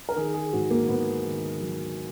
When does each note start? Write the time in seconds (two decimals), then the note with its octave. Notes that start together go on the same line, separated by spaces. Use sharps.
0.09 A#4
0.16 D#3 G#4
0.34 G#4
0.53 G#2 F#4
0.70 A#3
0.88 G#2 B3
1.25 D#3
1.60 F#3